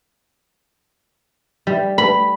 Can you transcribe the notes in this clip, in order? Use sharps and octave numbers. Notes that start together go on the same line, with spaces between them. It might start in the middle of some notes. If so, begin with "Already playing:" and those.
G3
B5